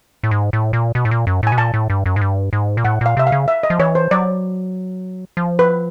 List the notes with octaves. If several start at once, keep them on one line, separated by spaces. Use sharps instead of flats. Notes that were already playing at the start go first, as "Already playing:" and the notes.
A2
G#2
A2
A#2
B2
A2
A#2
F#2
A2 G#5
B2
A#2 A5
A2
G2
F#2
G#2
G2
G#2
A#2
A2 F#5
A#2 F5
C3 E5
F5
C#3
E5
D#5
F3
E3 C#5
C5
F#3 D5
F3
B4